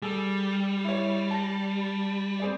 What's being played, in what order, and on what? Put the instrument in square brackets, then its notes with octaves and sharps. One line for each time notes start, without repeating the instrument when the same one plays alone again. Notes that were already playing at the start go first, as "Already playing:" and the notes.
[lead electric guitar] G3 [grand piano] G#4 A4 E6
[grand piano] E4 C#5
A5 A#6
C4 G#4 D5